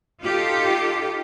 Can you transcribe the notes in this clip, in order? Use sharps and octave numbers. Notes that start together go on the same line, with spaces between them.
D#4 F4 G4 A4